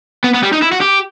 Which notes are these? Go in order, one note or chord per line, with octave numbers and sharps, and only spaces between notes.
B3
B3
G3
D#4
E4
F#4
G4